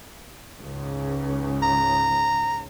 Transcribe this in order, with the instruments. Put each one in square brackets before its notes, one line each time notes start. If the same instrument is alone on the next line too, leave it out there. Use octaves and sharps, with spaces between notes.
[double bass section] C#2 G#2 C#3
[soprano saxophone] A#5